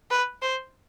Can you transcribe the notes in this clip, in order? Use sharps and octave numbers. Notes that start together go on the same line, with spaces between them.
B4
C5